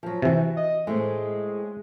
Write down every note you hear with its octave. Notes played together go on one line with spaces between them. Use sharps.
F3 F#3
C3 E3 F#4 E5
D#5
A2 G#3 C4